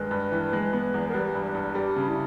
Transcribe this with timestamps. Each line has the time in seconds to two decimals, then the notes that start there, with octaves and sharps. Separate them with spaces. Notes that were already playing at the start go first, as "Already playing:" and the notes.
Already playing: G2 D#3 G#3 B4
0.11 G2
0.32 E3
0.53 G#3
0.73 B3
0.94 E2
1.09 A#4
1.14 G3 B4
1.35 G2
1.45 B4
1.55 G2
1.75 G3 G4
1.96 C#3
2.07 E4